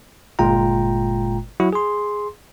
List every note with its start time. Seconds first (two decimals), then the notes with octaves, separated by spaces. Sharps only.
0.39 G1 A#2 G#3 F4 G5 A#5
1.60 F#3 E4 F#4
1.73 G#4 C6